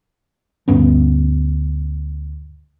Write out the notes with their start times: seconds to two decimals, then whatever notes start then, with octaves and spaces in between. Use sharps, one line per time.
0.68 D2 G2 B3 C#4